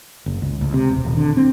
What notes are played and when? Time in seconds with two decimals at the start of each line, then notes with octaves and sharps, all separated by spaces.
0.26 F#1
0.42 C#2
0.61 C#2
0.74 C3
0.91 E1
1.05 D#1
1.17 D3
1.37 C4